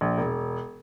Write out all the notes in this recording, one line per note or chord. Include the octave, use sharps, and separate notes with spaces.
A#1
E1